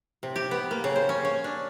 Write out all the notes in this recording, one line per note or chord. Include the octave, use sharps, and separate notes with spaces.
C3
G4
B3
A#3
C#3
C5
C#4
C#4
D4